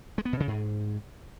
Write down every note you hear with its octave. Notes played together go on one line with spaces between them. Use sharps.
G#3
B3
B2
C#3
G#2